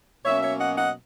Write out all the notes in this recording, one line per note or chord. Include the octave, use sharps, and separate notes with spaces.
B2 F#3 A#3 C#4 C#5 E5
C#5 E5
D#5 F#5
D#5 F#5